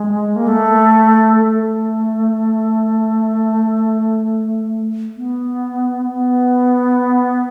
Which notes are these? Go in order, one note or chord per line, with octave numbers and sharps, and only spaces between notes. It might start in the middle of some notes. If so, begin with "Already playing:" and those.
Already playing: G#3
A#3
A3
A3
B3
B3